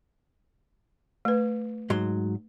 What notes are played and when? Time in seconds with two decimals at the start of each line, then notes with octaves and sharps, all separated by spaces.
1.25 A3 B4
1.90 G#2 F#3 C6